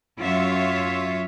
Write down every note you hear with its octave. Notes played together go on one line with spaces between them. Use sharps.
F#2 F4 C#5 E5